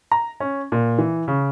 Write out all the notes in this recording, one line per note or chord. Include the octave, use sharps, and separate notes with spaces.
A#5
C#4
A#2
E3
C#3